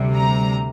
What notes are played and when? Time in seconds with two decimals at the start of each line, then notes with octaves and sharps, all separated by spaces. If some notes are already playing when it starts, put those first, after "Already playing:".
Already playing: D2 C3 G3
0.15 A#5